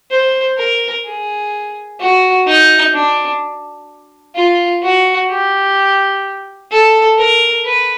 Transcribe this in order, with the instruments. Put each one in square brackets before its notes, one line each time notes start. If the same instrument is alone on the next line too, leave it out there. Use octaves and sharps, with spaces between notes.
[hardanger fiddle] C5
A#4
G#4
F#4
D#4
D4
F4
F#4
G4
A4
A#4
B4